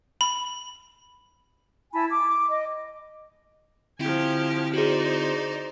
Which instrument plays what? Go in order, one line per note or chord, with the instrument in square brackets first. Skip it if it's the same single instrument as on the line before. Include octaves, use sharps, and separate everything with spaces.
[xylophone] B5
[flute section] E4 G#5 A5 B5
D6
D#5
[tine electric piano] D3 C4 E4 [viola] F3 G#5 [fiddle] G4
[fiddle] D#4 [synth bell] F#4 G#4 [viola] C5 D5